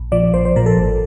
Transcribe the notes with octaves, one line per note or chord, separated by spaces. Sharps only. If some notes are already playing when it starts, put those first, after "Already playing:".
Already playing: A#1
A#2 F3 D5
A#1 C5
C5
A#2 F3 A#4
A4
G#1